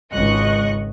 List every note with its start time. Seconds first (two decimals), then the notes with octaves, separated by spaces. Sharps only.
0.13 G#1 C#2 D#5 C#6 F#6